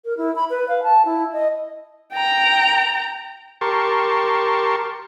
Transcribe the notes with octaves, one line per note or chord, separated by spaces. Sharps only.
A#4
E4
B5
B4
F5
A5
E4
D#5
G5 A#5
G4 A#4 A5 C6 C#6